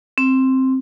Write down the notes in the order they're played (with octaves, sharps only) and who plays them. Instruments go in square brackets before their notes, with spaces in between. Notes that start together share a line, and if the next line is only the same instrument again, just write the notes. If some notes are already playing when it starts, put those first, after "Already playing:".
[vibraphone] C4